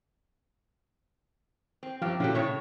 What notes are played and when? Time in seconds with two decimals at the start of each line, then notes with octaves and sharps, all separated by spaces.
1.83 C4
2.02 F#2 F3 C4 G4 F5 F6
2.20 A#2 D3 F#3 C#4 E4 G4
2.34 A2 C#3 C#5